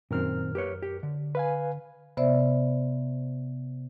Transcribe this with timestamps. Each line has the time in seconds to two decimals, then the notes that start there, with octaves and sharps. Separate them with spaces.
0.11 F#2 A#2 D#3 C4 A#4 F6
0.55 G4 B4 C#5
0.83 G4
1.03 D3
1.35 B4 F5 G#5
2.17 C3 B3 C5 D5 E5